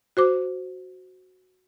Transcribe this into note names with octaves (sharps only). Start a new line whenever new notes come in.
F#4 C5 D6